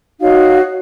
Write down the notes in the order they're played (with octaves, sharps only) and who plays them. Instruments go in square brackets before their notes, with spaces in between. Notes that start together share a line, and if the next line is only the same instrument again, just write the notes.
[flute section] D#4 F#4 C#5 F5